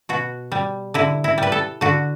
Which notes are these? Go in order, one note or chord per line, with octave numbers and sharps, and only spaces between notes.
B2 F#4
G3
D3 E4
E4
G3 B4
A4
D3 F#4